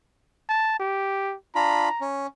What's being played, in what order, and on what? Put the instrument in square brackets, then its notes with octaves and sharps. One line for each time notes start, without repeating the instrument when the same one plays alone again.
[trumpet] A5
G4
[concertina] D4 F4 B5 [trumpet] A#5
[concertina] C#4